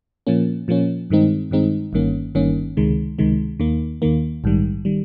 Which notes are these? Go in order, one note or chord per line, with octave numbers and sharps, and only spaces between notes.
A#2 F3 A#3 C#4
A#2 F3 A#3 C#4
G2 D#3 G#3 C4 D#4
G2 D#3 G#3 C4 D#4
G1 G2 D#3 A#3 C#4
G1 G2 D#3 A#3 C#4
C#2 C3 D#3 G#3
C#2 C3 D#3 G#3
D#2 D#3 A#3
D#2 D#3 A#3
A#1 G#2 D#3 G3
D#3 G3